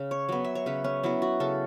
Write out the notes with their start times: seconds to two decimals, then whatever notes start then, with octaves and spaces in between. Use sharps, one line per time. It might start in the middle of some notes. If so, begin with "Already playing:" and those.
Already playing: C#3
0.11 C#5
0.29 F#3 B3
0.44 E5
0.55 C#5
0.66 C#3 B4
0.84 C#4
1.03 F#3 B3 E4
1.22 F#4
1.40 C#3 A4